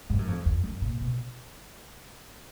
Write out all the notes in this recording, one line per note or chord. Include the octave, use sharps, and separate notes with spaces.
G2
F#2
F2
F2
F#2
A#2
B2